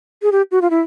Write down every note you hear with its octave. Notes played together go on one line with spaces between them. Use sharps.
G#4
G4
F#4
F4
E4